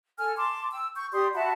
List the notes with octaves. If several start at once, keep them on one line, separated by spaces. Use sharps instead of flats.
A4 G#5 F6
A5 C6 D6
G5 E6
C#6 G6
G4 D5 C6 D#6
F#4 E5 A5 B5